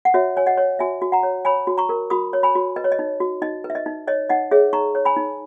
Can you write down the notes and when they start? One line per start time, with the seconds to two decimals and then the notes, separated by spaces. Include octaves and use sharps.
0.05 F#5
0.14 F#4 C#5 E5
0.37 C#5 G#5
0.46 D#5 F#5
0.57 C#5
0.79 F#4 E5 G#5
1.02 F#4
1.12 F#5 A#5
1.23 C#5
1.45 C#5 G#5 B5
1.67 F#4
1.78 A#5 C#6
1.89 A#4
2.10 F#4 B5 D#6
2.33 C#5
2.43 G#5 B5
2.55 F#4
2.76 B4 D#5
2.84 C#5
2.92 D#5
2.99 D#4
3.20 F#4
3.42 D#4 D#5
3.64 B4
3.70 E5
3.75 D#5
3.86 D#4
4.07 C#5 D#5
4.30 D#4 D#5 F#5
4.51 G#4 C#5 E5
4.73 D#4 A#5 C#6
4.95 C#5
5.05 G#5 B5
5.16 D#4